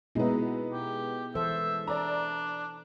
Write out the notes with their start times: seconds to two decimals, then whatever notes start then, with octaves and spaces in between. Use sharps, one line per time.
0.15 B2 G#3 B3 D#4 E4
0.72 G4
1.35 E3 A4 C5 E5
1.87 D4 D5 A#5